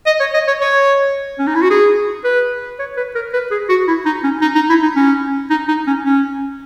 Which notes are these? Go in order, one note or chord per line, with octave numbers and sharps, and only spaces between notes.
D#5
C#5
D#5
C#5
C#5
C#4
D#4
E4
F#4
G#4
B4
C#5
B4
A#4
B4
G#4
F#4
E4
D#4
C#4
D#4
D#4
E4
D#4
C#4
D#4
D#4
C#4
C#4